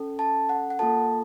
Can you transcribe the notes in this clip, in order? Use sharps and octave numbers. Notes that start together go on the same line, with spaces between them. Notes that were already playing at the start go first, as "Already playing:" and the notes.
Already playing: C#4 A4
A5
F#5
F#5
A#3 F4 A4 A5